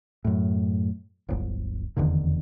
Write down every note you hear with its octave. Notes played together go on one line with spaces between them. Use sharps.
F#2 A2
D1 G1
F1 E2 D3 D#3